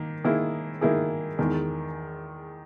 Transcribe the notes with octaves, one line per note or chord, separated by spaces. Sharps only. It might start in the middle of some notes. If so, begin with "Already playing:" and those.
Already playing: D#3 A#3
D#3 A#3 E4 G#4
D#3 A#3 E4 G#4
E2 D#3 G#3